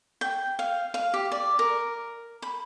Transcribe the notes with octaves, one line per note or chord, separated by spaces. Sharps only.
G5
F5
F5
G4
D5
A#4
B5